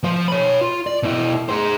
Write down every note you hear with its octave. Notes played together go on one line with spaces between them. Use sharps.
F3 C5
C#5 B5
F4
D5
B2 E4
G#4 C5